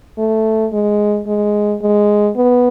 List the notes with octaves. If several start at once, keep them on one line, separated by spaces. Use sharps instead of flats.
A3
G#3
G#3
G#3
B3